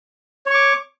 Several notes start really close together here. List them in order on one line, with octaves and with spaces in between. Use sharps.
C#5 C#6 D6